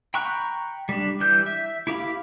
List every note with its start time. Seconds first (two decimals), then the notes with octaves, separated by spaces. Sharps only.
0.14 G5 A#5 B5 C#6 F#6
0.89 G3 D4
1.20 E3 G3 G6
1.46 E5
1.87 E4 G4 F5 B5